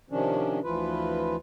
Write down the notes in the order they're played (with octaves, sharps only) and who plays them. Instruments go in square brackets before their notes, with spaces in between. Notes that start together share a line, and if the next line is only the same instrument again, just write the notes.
[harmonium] C3 D#3 F3 C#4 D4
D2 E3 F3 F4 B4